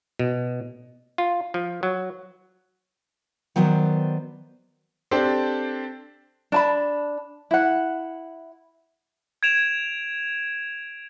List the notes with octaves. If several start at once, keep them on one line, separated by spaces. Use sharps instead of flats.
B2
F4
F3
F#3
D#3 F#3 B3 C5 D5
C4 D4 G4 A4 C5
D4 A5 B5
E4 F#5
G#6 D7 E7 F7